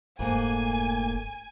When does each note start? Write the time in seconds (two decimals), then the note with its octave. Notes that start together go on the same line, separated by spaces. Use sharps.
0.19 F1 G#2 A3 A#3 G#5